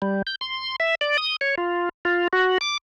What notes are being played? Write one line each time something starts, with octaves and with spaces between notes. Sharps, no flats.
G3
G6
C6
E5
D5
D#6
C#5
F4
F4
F#4
D6